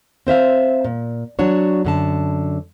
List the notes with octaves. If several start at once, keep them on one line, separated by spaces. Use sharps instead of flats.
C4 C5 E5 F5
A#2
F#3 D4 F#4 C#5
F#2 D3 A5